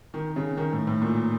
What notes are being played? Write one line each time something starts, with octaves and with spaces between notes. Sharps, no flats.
D#3
C#3
D#3
A2
A2
A#2